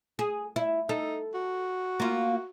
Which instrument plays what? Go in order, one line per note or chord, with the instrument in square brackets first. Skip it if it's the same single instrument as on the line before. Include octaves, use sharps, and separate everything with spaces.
[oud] G#4
E4
[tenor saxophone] D#4 [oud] A4
[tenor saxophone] F#4
[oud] A#3 F4